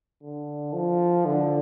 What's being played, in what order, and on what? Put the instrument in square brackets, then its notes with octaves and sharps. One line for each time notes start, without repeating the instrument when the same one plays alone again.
[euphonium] D3
F3
D3